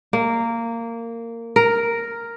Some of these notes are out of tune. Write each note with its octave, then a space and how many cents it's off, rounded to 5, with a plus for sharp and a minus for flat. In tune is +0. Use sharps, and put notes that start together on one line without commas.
A#3 -15
A#4 +0